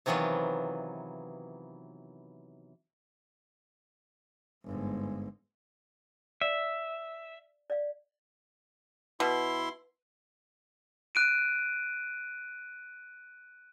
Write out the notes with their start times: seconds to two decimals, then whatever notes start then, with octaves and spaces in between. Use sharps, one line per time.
0.06 C3 D#3 E3 F#3 B3 F4
4.64 G1 G#2
6.41 D5 E5 F5
7.70 D5 F5
9.20 B2 E4 C6
11.15 F#6 D7 D#7